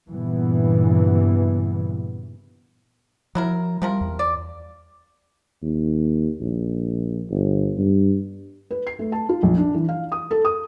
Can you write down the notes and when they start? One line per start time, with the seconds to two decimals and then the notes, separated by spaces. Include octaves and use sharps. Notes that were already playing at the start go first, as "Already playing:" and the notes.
0.10 G2 A#2 C#3 E3 B3
3.35 F3 F#3 E4 A#4
3.82 C3 F3 G3 A#4
4.01 E2
4.19 D5
5.62 D#2
6.41 A#1
7.30 G1
7.79 G2
8.71 B4
8.87 C7
8.99 A3
9.12 A5
9.29 F4
9.43 A#1
9.58 D4
9.74 E3
9.89 F5
10.12 D#6
10.31 A4
10.45 D#6